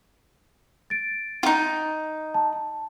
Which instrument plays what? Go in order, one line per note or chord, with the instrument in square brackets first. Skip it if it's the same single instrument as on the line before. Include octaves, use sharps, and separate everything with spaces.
[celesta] A6 D7
[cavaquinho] D#4 F4
[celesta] A5